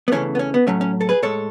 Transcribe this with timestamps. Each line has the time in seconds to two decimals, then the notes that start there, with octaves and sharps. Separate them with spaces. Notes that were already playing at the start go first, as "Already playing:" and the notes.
0.08 B3
0.12 E2 C#3 E3 A3 C#4
0.35 B3
0.39 C#4
0.54 B3
0.67 A2 F#3 A3 C#4
0.81 C#4
1.01 A4
1.09 G#4 B4
1.22 A2 G#3 A4 C#5